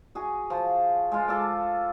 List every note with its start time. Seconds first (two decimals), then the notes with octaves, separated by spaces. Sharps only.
0.15 F#4 G#4
0.50 F3
1.12 G#3 F4
1.28 A4 F5 D6